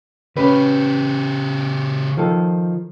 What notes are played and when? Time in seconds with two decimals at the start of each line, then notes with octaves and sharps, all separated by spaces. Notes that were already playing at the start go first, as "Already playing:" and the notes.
0.37 C#3 C#4 G4 B4
2.17 D#3 F3 A4